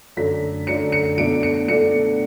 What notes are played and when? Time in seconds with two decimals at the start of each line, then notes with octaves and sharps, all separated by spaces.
0.17 F#2 D3 A3 D4 B6
0.67 F#2 D3 A3 D4 C#7
0.92 C#7
1.18 B2 A3 D4 D7
1.43 C#7
1.68 B2 A3 D4 C#7